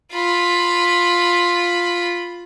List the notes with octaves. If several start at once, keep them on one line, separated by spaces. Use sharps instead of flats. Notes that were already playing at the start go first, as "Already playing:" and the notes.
F4 B5